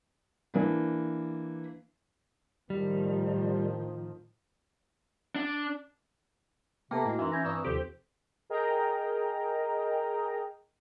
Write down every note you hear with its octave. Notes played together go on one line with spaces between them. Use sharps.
E3 A#3 D4
A2 D#3 F3 G3
D4
C3 A#3 B3 A4 B4 G5 A5
A2 G#3 E4 F#4
F#2 E3 D#4 F5 A#5 C6
C#4 G6 G#6 A#6
G2 C4 D5 A#5 C#6 D#6 E6
D#2 C3 F3 G4 A4 C5
G#4 A#4 D#5 G5 A#5